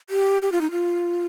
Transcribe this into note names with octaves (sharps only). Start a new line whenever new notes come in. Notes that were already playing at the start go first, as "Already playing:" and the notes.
G4
G4
F4
D#4
F4